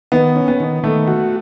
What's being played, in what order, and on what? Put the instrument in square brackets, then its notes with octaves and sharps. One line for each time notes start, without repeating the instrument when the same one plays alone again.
[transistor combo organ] D#3 [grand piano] B3
[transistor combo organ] C#4
[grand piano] B3
[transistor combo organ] D#3
[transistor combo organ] D#3 [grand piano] A3
[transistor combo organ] F#4